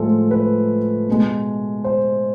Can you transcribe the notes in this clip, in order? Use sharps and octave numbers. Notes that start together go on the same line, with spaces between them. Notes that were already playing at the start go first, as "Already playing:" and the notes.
Already playing: A2 F3 G#3 F4 A4
B4
B2 G#3
C5